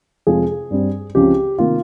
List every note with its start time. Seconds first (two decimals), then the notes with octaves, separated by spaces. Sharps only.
0.27 F2 C3 F3 G#3 G#4
0.71 G2 G3 C4
1.15 C#2 C#3 F3 C4 G4
1.58 C3 D#3 A#3 F4